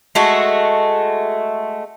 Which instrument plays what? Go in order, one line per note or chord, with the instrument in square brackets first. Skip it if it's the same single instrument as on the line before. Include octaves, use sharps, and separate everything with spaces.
[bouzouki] G#3 A3 F#4